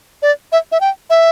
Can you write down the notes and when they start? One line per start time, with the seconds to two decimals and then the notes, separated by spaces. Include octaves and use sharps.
0.22 D5
0.52 E5
0.72 E5
0.81 G5
1.10 E5